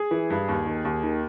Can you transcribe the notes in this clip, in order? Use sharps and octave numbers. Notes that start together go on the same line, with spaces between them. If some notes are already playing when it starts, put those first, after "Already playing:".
Already playing: G#4
E3
G2
D#2
D#3
D#2
D#3